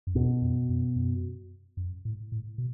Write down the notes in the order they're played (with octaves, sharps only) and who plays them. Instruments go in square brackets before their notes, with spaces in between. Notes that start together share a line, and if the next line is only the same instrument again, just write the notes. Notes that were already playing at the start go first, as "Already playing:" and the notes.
[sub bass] F#2
[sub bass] E2 [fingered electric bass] B2
[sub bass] F#2
F#2
F#2
F#2
A2
A2
B2